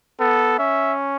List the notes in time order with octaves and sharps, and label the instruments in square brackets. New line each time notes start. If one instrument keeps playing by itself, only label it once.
[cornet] B3 [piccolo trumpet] A4
[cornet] C#4 [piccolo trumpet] E5